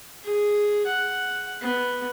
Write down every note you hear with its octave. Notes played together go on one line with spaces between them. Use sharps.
G#4
F#5
B3